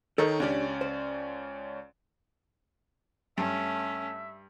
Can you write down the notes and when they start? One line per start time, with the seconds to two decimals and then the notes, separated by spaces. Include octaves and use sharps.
0.18 D#3 D#4 A4 A#4 C#5
0.40 C#2 C#4 D4 G4 D5
0.81 C5
3.38 G2 A3 C#4 E5